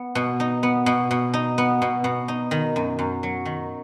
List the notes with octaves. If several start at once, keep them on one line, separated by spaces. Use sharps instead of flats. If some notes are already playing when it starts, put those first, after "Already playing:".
Already playing: B3
B2
D#4
B3
B2
B2
D#4
B3
B2
B2
D#4
D#3
F#2
F#2
F#3
D#3